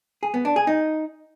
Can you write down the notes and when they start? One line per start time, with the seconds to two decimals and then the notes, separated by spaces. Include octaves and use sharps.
0.23 G#4
0.34 B3
0.45 D4
0.56 G#4
0.67 D#4